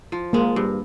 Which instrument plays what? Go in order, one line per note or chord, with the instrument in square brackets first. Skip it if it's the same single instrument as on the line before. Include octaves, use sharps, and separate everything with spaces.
[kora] F3
[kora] G#3 [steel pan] A#3
[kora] G2